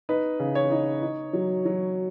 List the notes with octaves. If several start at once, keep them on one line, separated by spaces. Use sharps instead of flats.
D#4 B4
C#3
C#5
D#4
D#4
F#3
F#3